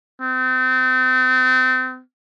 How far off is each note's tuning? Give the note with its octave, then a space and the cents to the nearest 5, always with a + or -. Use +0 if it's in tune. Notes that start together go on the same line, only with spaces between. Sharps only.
C4 -35